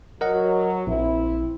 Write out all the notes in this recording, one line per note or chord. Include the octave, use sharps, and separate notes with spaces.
F#3 A#4 D#5 F#5
A#1 C4 E4